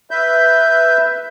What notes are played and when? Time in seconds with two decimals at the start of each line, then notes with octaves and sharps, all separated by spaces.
0.11 B4 E5 G6